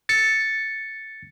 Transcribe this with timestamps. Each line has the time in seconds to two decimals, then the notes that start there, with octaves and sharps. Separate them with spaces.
0.09 A6 C#7